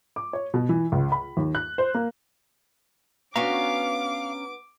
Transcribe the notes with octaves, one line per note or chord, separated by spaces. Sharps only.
D6
C#5
B2
E3
C#2
B5
D#2
F#6
C5
A#3
B3 C#4 D4 F#4 F5 G#5 A#5 D6